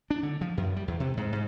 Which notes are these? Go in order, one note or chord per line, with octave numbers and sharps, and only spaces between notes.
D4
D3
F3
F#2
G3
E2
C3
G#2
G#2